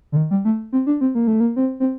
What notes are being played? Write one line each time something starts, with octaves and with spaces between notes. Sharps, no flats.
D3
D#3
G3
A3
C4
D4
C4
A#3
A3
A#3
C4
C4